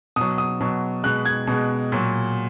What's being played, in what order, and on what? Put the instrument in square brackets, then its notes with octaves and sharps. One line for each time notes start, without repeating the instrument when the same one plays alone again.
[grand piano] B2 F#3 D#6
D#6
B2 F#3
B2 G#3 F#6
G#6
B2 G#3
A#2 F#3